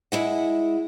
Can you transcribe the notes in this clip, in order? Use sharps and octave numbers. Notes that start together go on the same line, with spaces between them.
G#3 E4 F#5